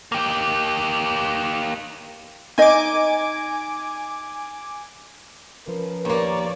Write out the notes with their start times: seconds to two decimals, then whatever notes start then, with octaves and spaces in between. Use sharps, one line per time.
0.12 A#3 G4
2.58 D#4 D#5 G#5 D6
5.68 F3 C#4 A#4 B4
6.05 D#2 A#3 C#5 D5